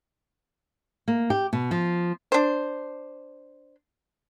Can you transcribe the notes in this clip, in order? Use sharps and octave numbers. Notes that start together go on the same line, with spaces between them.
A#3
G4
B2
F3
D4 C5